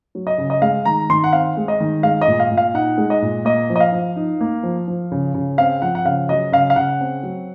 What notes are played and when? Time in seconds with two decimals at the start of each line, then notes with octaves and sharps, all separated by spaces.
0.15 F#3
0.27 D#5
0.38 C#3
0.50 D#5
0.62 G#3 F5
0.85 D#3 A#5
1.10 D#3 C6
1.24 F#5
1.33 C4 F5
1.57 G#3
1.68 D#5
1.80 D#3
2.03 G#3 F5
2.21 D#5
2.28 A#2
2.40 F5
2.51 A#2
2.57 F5
2.74 D#4 F#5
2.98 G#3
3.10 D#5
3.22 A#2
3.45 A#3 D#5
3.70 F3
3.76 D#5
3.80 F5
3.92 F3
4.16 D#4
4.41 A#3
4.63 F3
4.88 F3
5.12 C#3
5.34 C#3
5.58 C4 F5
5.82 F3 F#5
5.95 F#5
6.05 C#3 F5
6.29 F#3 D#5
6.52 C#3 F5
6.70 F5
6.76 C#3 F#5
7.01 C4
7.23 F#3